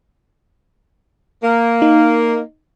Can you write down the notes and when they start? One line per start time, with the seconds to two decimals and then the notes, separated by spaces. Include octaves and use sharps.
1.43 A#3
1.82 D#4